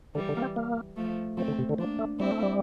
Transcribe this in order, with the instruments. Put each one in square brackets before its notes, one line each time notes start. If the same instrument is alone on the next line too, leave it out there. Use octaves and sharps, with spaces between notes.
[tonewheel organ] D3 [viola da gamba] E3 G3
[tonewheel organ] D3
A#3
C4
A#3
[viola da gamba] F3 A3
[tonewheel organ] F3 [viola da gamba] A3 C4
[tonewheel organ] D3
C3
D3
[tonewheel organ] F3 [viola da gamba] A#3 D4
[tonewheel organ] A3
[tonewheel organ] G3 [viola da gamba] C4 E4
[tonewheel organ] A3
G3